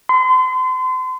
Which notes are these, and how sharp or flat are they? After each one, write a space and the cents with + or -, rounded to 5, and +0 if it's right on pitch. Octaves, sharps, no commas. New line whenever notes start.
C6 -35